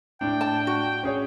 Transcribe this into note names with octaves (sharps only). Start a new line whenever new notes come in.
A2 D4 G5
A5
F#4
C#4 G#4 C#5